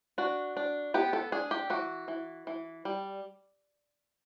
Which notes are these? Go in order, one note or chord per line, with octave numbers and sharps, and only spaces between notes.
D4 F#4
D4
B3 G4
A4
D4 G#4
G4
E3 F#4
E3
E3
G3